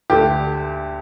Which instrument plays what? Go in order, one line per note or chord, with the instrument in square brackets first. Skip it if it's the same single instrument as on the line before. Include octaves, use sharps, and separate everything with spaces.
[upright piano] D2 D3 G4